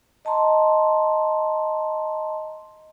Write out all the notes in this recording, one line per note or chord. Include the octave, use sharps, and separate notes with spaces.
D#5 A5 A#5 C6